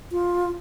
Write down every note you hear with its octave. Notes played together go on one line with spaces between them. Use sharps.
F4